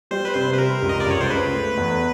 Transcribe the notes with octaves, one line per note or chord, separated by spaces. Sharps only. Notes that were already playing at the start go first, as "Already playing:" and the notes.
G3 C5
B4
C3 C5
B4
G3 A#4
C#2
D#5
D5
C#2 C#5
C5
C#3 B4
A3
E2